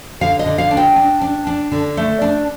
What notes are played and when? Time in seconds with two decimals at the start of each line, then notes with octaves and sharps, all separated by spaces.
0.21 D3 F5
0.39 D#5
0.46 D3
0.58 F5
0.71 D4
0.77 G5
0.96 D4
1.21 D4
1.47 D4
1.72 D3
1.97 A3
2.22 D4